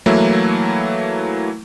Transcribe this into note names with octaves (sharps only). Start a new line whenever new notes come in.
E3 F#3 A3 A#3 E4